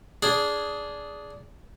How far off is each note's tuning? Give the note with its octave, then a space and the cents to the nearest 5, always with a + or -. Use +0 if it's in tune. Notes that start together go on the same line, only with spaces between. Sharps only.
D4 -15 G#4 +0